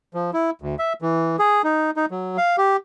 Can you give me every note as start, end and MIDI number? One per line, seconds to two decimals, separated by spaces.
0.14 0.31 53
0.33 0.50 64
0.62 0.75 38
0.79 0.93 76
1.02 1.36 52
1.39 1.62 68
1.64 1.91 63
1.96 2.06 63
2.11 2.37 54
2.38 2.56 77
2.58 2.76 67